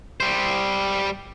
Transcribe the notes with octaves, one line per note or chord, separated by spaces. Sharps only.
G3 C5